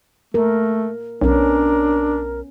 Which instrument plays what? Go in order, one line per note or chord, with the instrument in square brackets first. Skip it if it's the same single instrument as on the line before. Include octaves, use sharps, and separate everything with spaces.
[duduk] A3 [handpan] A#3 A#4
[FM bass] B1 [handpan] B3 C#4 [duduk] D4 [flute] A#4